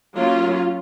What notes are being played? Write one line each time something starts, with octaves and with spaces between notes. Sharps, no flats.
F#3 A#3 C#4 F4